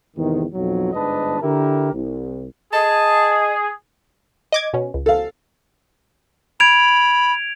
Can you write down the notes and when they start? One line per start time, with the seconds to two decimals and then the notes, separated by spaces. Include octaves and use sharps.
0.17 E2 G#2 C3 D#3
0.54 B1 F2 F#3
0.93 G1 G#2 D4 B4 D#5 A5
1.41 D3 E4 G4 A#4
1.93 C2
2.73 G#4 D#5 A5
4.52 D#5 D6 G#6
4.73 B2 C#4
4.94 C#2
5.06 A4 F5
6.60 B5 G#6 D7 F7